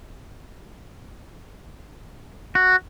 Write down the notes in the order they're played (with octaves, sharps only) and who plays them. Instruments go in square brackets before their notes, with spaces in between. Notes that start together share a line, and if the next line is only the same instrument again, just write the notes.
[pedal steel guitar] F#4